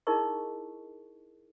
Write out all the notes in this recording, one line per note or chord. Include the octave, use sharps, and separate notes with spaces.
D#4 E4 G#4 A#4 D#5 C#6